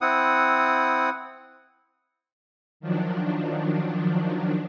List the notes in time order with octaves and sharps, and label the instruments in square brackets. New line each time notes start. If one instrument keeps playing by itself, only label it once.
[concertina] C4 E4 F#5 D#6
[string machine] D#3 F3 F#3 D4